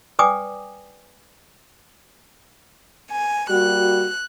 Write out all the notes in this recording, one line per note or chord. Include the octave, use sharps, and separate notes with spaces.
B4 D5 G5 G#5 D6 D#6
G#5
G3 A#3 F#4 F#6